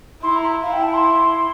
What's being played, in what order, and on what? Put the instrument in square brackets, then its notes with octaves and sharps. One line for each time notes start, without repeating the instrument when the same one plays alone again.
[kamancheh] E4 [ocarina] C6
[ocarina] A#5
[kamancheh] E4 [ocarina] F5
[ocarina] G5
A5
C6